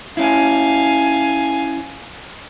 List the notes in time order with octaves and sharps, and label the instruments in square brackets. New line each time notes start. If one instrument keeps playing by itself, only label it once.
[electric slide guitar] C#4 E4 [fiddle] F5 G#5